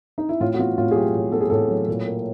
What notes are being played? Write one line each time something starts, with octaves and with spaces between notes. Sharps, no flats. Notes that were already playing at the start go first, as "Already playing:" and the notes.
D#4
E4
A2 F4
F#4
B3 F4
A2 F4
G#4
F#3 G4
A2
B3 A4
G#4
A2 A4
F#3
A#2
A#3